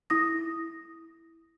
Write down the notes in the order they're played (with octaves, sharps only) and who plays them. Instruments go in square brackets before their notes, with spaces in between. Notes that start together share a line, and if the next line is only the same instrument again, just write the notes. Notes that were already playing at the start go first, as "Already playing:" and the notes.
[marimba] E4 D#6 A#6